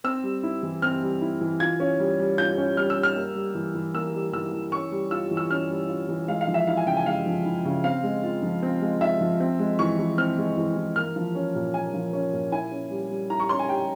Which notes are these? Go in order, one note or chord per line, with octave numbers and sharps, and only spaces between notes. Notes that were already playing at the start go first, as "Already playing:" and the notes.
C4 E6
G3
E4
E3
C4 F6
G3
E4
E3
F4 G#6
C#4
G3
G3
F4 G6
C#4
G3 F6
E6
G3
F6
A#3
G3
E3
E3
A#3 E6
G3
E3 E6
E3
C#4 C#6
G3
F4 E6
E3
E6
C#4 F6
G3
F4
E3
G#3 F5
F5
F3
E5
E4 F5
G#5
C#3 G5
G#5
G#3 F5
F3
E4
C#3
C4 F5
G#3
F4
F3
C4
G#3
F4 E5
F3
C4
G#3
E3 C#6
E3
C4 F6
G#3
E3
E3
A#3 F6
F3
C#4
A#2
A#3 G#5
F3
C#4
A#2
E4 G#5
C#4
G3
G3
E4 A#5
C#6
C#4 C6
G#5
G3 G5